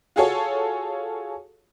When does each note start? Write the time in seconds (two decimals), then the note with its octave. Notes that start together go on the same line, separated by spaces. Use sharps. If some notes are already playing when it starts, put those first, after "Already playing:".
0.16 F4 F#4 G#4 A4 C#5